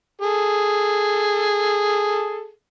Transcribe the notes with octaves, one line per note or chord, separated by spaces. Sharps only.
G#4 A4